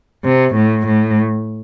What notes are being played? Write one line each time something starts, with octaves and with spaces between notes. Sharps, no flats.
C3
A2
A2